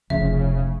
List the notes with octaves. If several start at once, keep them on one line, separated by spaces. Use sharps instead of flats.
F1 F2 C#3 F3 E5